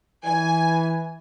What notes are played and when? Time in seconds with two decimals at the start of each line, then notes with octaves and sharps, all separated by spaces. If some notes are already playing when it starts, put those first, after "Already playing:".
0.25 E3 G#5